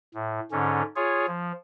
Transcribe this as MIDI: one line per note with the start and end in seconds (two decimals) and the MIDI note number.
0.14 0.40 45
0.52 0.82 44
0.52 0.82 50
0.52 0.82 61
0.96 1.26 65
0.96 1.26 68
0.96 1.26 73
1.27 1.52 53